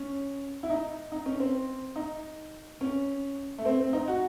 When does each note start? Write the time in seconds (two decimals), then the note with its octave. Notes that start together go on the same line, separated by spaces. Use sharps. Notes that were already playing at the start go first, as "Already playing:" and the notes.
Already playing: C#4
0.63 E4
0.70 D#4
1.12 D#4
1.26 C#4
1.40 C4
1.96 D#4
2.81 C#4
3.58 A3
3.65 C4
3.80 C4
3.93 D#4
4.08 F#4